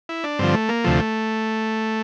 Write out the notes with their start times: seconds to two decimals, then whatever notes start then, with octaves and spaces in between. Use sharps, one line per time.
0.09 E4
0.24 D4
0.39 G2 D3 F3 C4
0.54 A3
0.69 A#3
0.84 D2 C3 F3 A3